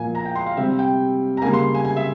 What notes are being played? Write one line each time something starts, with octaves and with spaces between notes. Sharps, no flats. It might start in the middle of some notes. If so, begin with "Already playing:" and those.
Already playing: A#2 F3 A#3 G#5
A#5
G5
C6
F5
C3 G3 C4 E5
G5
A#5
C#3 G3 A#3 G#5
C6
G#5
G#5
E5